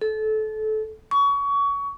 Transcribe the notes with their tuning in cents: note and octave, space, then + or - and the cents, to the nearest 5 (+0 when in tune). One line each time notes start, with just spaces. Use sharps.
A4 -25
C#6 +25